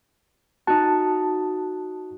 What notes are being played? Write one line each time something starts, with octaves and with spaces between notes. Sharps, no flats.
D#4 F#4 A5